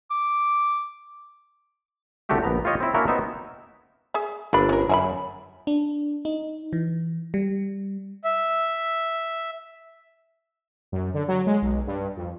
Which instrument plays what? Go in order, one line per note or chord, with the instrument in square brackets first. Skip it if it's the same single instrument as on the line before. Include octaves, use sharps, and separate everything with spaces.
[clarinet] D6
[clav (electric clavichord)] C2 D3 A3 F#4 G4 E5
A#1 B3 A#5
F4 G4 C#5 D#5
C4 E4
A#3 C#4 D4 E4 F#4 A#4
B3 C4 D#4 E5
[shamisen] G#4 E5
[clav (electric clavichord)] G1 D4 [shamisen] A#3 B5
[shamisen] C#4 A#4
[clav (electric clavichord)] F#2 [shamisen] G#4 E5 B5
[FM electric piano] D4
D#4
E3
G3
[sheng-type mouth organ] E5
[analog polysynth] F#2
D3
F#3
G#3
B1
G2
F2